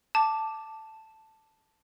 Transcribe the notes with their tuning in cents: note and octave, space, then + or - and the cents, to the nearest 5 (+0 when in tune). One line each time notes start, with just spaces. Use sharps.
A5 +0 D6 +0